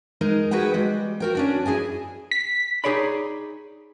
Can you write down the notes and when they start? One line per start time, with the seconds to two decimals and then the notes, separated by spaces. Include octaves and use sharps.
0.21 G#3 D#4 A#4 D#5
0.51 F#4 G#4 B4 F#5 G5
0.74 G3 G#3
1.20 F#4 A#4 G5
1.35 C#4 D4 F#4
1.66 E4 G#4 D#5 G#5
2.31 B6
2.84 D#4 F#4 G#4 C#5 D5 B5